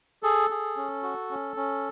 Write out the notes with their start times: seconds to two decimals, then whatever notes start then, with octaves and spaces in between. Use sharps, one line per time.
0.23 G#4 A4
0.50 G#4
0.76 C#4
1.03 F#4
1.31 C#4
1.57 C#4